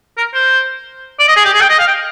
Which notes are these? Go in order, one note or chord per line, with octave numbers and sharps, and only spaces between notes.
A#4
C5
D5
D#5
G#4
G4
G#4
G5
D#5
F5
G5